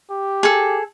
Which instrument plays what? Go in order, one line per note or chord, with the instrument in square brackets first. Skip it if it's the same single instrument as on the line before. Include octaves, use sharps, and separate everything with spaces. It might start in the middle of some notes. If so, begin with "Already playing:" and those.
[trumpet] G4
[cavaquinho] G#4 A4